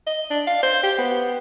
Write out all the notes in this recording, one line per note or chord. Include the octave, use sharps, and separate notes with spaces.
D#5
D4
F5
C5
G4
B3